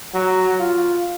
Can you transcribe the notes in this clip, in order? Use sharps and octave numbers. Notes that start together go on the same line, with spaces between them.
F#3
F4